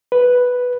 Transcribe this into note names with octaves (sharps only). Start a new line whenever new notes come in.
B4